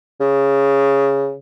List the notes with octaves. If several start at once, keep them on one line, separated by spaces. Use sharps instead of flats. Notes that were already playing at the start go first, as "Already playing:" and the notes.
C#3